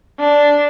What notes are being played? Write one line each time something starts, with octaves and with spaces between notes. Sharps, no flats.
D4